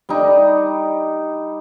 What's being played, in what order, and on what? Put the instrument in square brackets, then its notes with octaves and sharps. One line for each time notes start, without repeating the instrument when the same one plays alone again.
[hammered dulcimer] G3 D#4